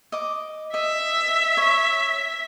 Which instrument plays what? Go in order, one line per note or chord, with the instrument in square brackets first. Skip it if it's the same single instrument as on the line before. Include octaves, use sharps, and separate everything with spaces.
[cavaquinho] D#5 D6
[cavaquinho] D#5 [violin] E5
[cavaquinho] C#5